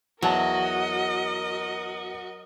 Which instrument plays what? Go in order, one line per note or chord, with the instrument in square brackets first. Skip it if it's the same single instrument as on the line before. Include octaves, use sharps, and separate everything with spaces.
[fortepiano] E2 A5 [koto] F#3 [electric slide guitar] F#4 [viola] A#4 D#5